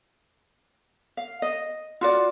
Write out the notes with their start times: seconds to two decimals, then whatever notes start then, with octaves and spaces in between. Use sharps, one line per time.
1.17 F5
1.42 D#5
2.01 F4 F#4 D5